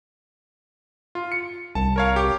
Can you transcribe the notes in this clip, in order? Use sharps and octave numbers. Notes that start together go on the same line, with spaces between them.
F4
C#7
C2 A5
A#4 C#5 F5
G4